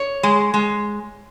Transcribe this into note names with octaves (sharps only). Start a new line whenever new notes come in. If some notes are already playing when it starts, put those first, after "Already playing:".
Already playing: C#5
G#3
G#3